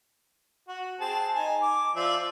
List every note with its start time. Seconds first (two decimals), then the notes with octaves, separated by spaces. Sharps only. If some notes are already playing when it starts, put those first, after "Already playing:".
0.68 F#4
1.01 C4 G#4 A5
1.36 D#4 G#5
1.62 D6
1.96 F3 D5 E5